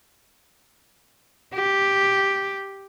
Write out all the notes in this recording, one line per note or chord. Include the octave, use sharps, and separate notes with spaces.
G4